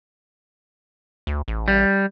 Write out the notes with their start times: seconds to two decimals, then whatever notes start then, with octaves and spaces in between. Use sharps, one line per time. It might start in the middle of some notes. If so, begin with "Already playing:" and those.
1.27 D2
1.48 A1
1.68 G3